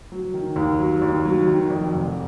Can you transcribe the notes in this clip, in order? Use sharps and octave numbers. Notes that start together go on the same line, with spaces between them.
F#3
D#3
D#2
F#3
D#2
F#3
D#3
F2
F1